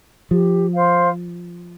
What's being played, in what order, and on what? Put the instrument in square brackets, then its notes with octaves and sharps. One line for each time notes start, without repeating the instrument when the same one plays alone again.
[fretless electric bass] F3 [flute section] G4
[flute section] C5 F5 C6